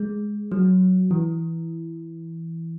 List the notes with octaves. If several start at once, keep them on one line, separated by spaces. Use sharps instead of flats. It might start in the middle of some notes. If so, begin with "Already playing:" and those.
Already playing: G#3
F#3
E3